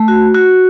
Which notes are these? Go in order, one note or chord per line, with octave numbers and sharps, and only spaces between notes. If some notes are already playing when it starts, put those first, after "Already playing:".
Already playing: A3
F#4
F#4